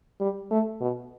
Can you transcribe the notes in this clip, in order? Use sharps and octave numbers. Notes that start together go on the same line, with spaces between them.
G3
A3
B2